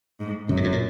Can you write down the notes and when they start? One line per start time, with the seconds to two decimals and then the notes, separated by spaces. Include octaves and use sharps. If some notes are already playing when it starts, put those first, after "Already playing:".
0.20 G#2
0.49 F#2 C#3
0.57 A#2
0.64 G#2
0.72 A#2